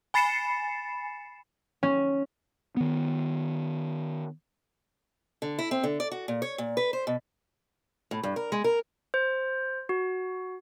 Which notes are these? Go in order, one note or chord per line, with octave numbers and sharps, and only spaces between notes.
G#5 B5 A6 C7 C#7 E7
C#4
D#3 B3
D3
E4
C4
D3
D5
F#4
A#2
C#5
A#2
B4
C5
B2
A2
G2
A#4
G#3
A#4
C5
F#4